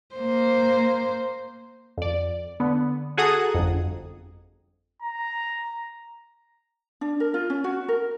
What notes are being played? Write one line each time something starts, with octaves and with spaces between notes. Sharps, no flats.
A#3 C5
F2 D5
D3 B3
F#4 G#4 A4 F#5 A#5 D#6
G1 F2
A#5
D4
A#4
F4
C#4
F#4
A#4